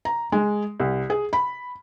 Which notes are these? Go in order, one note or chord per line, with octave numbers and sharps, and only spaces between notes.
A#5
G#3
C2
G#4
B5